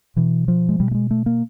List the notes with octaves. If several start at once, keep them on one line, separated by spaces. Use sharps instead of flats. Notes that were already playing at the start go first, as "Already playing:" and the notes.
B2 E3
F3
G#3
B2 G3
A3
G#3
A3
A#3